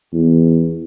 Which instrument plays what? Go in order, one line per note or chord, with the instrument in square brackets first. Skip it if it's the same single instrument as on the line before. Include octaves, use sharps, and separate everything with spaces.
[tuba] E2